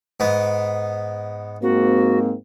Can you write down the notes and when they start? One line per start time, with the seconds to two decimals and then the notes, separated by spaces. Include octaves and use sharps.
0.20 G#2 B3
1.62 G#2 A#3 C4 F#4